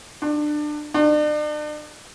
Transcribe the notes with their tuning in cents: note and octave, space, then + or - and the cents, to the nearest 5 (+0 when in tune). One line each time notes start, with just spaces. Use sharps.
D4 +25
D4 +40